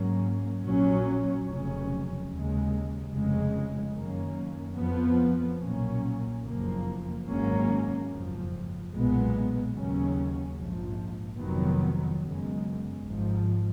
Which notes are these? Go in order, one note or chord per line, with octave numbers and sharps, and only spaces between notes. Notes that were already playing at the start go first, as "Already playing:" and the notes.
Already playing: G#2 F#3 A#3 C#4
A#1 A#2 F#3 C#4
F1 F2 C#3 F#3 C#4
D#2 C#3 G#3
F1 F2 C#3 G#3
F#2 D#3 A#3 C#4
F2 F3 B3
B1 A#2 F#3 A#3 C#4
F#1 F2 F3 A#3
G#1 G#2 F#3 A#3 C#4
F#1 F2 F3
B1 A#2 G#3 B3
D#2 C#3 F#3 C#4
A#1 G#2 F3
F1 F2 D#3 F#3 B3
F#2 C#3 G#3 B3
G#1 G#2 F3